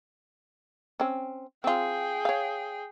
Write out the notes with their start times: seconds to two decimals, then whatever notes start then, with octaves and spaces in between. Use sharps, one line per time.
1.00 C4 C#4
1.64 C4 F4 G#4 G5
2.25 C#5 F5